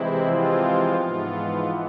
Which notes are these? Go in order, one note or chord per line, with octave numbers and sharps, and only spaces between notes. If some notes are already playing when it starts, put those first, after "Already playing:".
Already playing: C3 E3 G#3 C4 E4
F3 F4
G#2 E3 B3